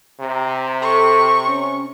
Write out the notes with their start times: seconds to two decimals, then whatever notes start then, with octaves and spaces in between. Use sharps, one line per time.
0.20 C3 A#5
0.82 A4 C#6
1.46 C#4